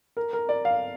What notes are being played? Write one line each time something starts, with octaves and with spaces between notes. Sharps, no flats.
A#4
A#4
D5
F5